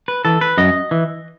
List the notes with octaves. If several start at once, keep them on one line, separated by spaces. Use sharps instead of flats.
B4
E3 A4
B4
F#2 D#5
E3